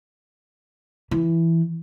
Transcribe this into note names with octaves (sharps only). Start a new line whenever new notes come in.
E3